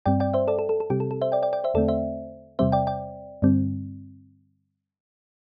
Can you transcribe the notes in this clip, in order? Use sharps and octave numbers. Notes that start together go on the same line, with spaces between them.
G2 G3 C4 D5 G5
D5 G5
C5 E5
A4 D5
A4
A4
A4
C3 G3 C4 G4
A4
A4
C5 E5
D5 G5
D5 G5
D5 G5
C5 E5
E2 D3 A3 C4 A4 D5
C5 E5
E2 C3 G3 C4 C5 E5
D5 G5
D5 G5
G2 D3 G3 C4